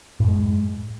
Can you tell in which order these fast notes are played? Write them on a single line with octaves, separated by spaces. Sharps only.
A2 F#2 G#3